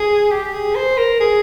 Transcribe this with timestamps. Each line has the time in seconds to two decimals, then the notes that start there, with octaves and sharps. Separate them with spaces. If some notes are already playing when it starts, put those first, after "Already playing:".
Already playing: G#4
0.30 G4
0.53 G#4
0.75 C5
0.97 A#4
1.21 G#4